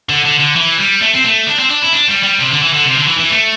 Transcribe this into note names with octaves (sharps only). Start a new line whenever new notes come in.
D3
D3
D3
E3
G3
A3
C4
A3
D4
C4
D4
E4
D4
G3
G3
C3
D3
E3
D3
C3
D3
E3
E3
A3